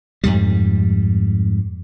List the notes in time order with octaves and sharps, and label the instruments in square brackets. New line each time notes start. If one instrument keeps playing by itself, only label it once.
[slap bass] F2 G#2 G3